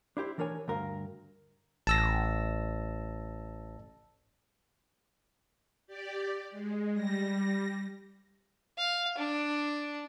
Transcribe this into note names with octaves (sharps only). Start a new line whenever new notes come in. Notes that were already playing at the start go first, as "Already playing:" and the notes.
D4 E4 G4 C5
E3 D4 A#4 C#5 G#5
D2 G2 A#4 F5
A1 A5 E6 A#6
G4 D5
G#3
G3 A#6
F5
D4